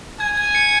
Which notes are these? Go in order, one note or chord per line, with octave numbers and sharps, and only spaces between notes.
G#5 G#6
G#6
C#7